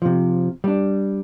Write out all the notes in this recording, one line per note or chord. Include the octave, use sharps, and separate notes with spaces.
C3 F3
G3 D4